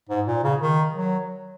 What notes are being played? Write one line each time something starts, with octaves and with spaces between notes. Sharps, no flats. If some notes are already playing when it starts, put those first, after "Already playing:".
G#2
A#2
C#3
D#3
F#3